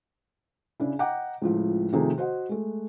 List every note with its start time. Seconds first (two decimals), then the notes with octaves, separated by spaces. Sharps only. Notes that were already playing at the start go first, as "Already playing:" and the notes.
0.80 C#3 D4 E4
0.99 D#5 F#5 G5 A#5 D6
1.42 C#2 A2 F3
1.93 C3 D#3 F3 A3 D#4 G#4
2.18 F#4 C5 D#5 F#5
2.49 G#3 A3